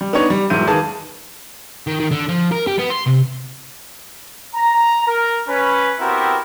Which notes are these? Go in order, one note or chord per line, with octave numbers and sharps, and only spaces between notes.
G3
B3 D4 D#4 C#5
G3
E1 G#2 F#3 E4 G6 D#7
D#3 A#3 G#4 B4 G#5 A5
D#3
D#3
D3
F3
A#4
G4
B3
C6
C3
A#5
A#4
C#4 B4
B3 C4 E4 F#4 G4 A#4